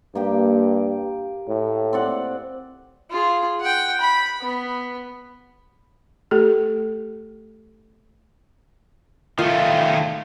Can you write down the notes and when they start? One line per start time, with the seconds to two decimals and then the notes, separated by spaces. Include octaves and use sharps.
0.15 G2 A#3 G4 G5
1.48 A2
1.93 C4 D5 F#5
3.10 F4 G#4
3.61 F#5 G5
4.00 B5
4.41 B3
6.31 A3 G4 A4
9.38 D#3 A3 F4